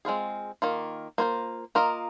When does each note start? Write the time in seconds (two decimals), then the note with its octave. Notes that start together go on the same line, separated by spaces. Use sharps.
0.05 G#3 C4 F4 G#4
0.62 D#3 A#3 F4
1.18 A#3 F4 C5
1.75 A#3 F4 A#4 D#5